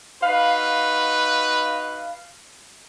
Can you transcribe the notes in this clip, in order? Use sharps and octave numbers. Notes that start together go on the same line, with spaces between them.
D#4 F#4 B4 F5